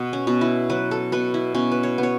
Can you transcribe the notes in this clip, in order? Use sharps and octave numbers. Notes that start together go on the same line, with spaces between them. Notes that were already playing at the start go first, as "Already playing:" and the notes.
Already playing: B2 B3
C#4
B2
E4
F#3 B4
A4
B2 B4
E4
B2 C#4
B4
C#5
B3
C#5